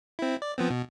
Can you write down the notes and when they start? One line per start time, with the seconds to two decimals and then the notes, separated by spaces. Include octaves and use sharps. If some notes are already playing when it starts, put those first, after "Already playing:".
0.19 C4 E4
0.42 D5
0.58 F3 B3 C4
0.70 B2